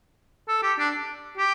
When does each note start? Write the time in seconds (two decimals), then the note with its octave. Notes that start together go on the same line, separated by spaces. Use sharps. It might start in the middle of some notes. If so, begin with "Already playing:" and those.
0.48 A4
0.62 G4
0.78 D4
1.37 G4